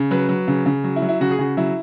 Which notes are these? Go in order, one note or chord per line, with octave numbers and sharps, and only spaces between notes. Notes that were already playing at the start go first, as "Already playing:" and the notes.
Already playing: C#3
F#3 B4
F#3
C#3
C#3
F#3
E4
F#3
E4
C#3 F#4
G#4
C#3 F#4
F#3 E4